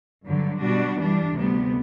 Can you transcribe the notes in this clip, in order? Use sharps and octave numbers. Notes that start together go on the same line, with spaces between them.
G2 D3 F#3
B2 G3 D4 F#4
G2 E3 G3 D4
D2 C3 G3 B3